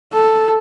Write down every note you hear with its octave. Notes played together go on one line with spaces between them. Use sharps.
A4